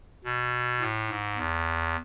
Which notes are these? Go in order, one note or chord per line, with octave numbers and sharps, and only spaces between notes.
B2
A2
G#2
E2